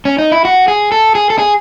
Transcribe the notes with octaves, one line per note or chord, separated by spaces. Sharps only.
C#4
D#4
E4
F#4
G#4
A4
G#4
A4
G#4